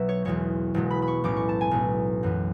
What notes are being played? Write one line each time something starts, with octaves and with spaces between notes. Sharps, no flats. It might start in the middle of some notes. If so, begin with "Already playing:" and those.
Already playing: B1 B2 F#3 E5
C#5
E1 E2 B2 G#3 C#5
E1 E2 B2 G#3
B5
B5
C#6
B1 A2 G#3 C#4 D6
C#6
A5
G#5
B1 A2 G#3 C#4
F#2 E3 B3